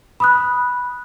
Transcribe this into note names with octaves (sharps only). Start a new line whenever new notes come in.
B5 D#6 F#6